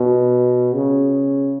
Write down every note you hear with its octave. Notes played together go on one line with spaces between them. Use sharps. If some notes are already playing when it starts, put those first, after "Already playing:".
Already playing: B2
C#3